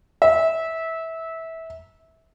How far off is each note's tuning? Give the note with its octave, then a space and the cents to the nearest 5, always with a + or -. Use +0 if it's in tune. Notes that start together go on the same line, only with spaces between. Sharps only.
E5 -20